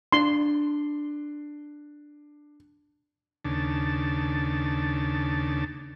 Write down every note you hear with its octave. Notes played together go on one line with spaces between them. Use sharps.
D4 C6
D#2 C#3 D4 A5